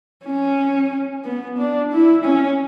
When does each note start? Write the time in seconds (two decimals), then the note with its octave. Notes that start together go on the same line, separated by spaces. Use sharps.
0.26 C#4
1.25 B3
1.59 D4
1.92 E4
2.24 C#4